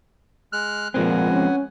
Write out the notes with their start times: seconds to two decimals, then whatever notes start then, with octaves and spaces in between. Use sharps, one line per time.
0.53 G#3 F6 F#6
0.94 A#2 F3 G#3 B3 C4 F#5 G#5
1.31 C#4